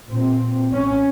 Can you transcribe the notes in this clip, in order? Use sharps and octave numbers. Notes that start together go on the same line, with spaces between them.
A#2 C4
C#4